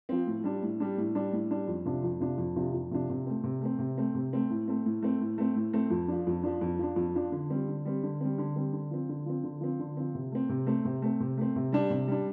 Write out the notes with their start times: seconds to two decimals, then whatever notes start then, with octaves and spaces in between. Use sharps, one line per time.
0.09 F3 C4
0.27 A2
0.44 G3 D4
0.63 A2
0.80 G3 D4
0.98 A2
1.15 G3 D4
1.33 A2
1.51 G3 D4
1.68 F2
1.86 C3 F3 D4
2.04 F2
2.20 C3 F3 D4
2.38 F2
2.56 C3 F3 D4
2.74 F2
2.91 C3 F3 D4
3.09 C3
3.26 A3 C4
3.44 C3
3.61 A3 C4
3.79 C3
3.97 A3 C4
4.15 C3
4.33 A3 C4
4.50 A2
4.68 A3 C4
4.86 A2
5.03 A3 C4
5.21 A2
5.38 A3 C4
5.56 A2
5.73 A3 C4
5.90 F2
6.08 F3 D4
6.27 F2
6.43 F3 D4
6.61 F2
6.79 F3 D4
6.96 F2
7.15 F3 D4
7.32 D3
7.50 G3 C4
7.68 D3
7.85 G3 C4
8.03 D3
8.21 G3 C4
8.38 D3
8.56 G3 C4
8.73 D3
8.91 F3 C4
9.09 D3
9.26 F3 C4
9.44 D3
9.61 F3 C4
9.79 D3
9.97 F3 C4
10.15 C3
10.32 A3 C4
10.49 C3
10.67 A3 C4
10.85 C3
11.02 A3 C4
11.21 C3
11.38 A3 C4
11.56 C3
11.72 G3 D4
11.91 C3
12.08 G3 D4